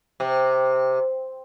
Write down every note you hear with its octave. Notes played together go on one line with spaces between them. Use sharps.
C3